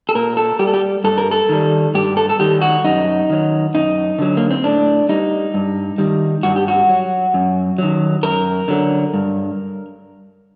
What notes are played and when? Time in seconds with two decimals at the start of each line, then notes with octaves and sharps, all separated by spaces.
0.09 A4
0.15 A#2 A#4
0.37 A4
0.59 G3 G4
0.67 A4
0.74 G4
1.04 G2 A4
1.18 A#4
1.31 A4
1.49 D#3 G3
1.94 G2 G4
2.17 A4
2.29 A4
2.39 D#3 G3 G4
2.61 F#4
2.84 F#2 D#4
3.30 D#3 F#3
3.74 F#2 D#4
4.19 D3 F#3
4.37 A#3
4.51 C4
4.64 A2 D4
5.09 G3 D#4
5.54 G2
5.98 D#3 G3
6.43 G2 F#4
6.56 G4
6.68 F#4
6.89 F#3
7.34 F#2
7.78 D#3 F#3
8.23 F#2 A#4
8.68 D3 F#3
9.14 G2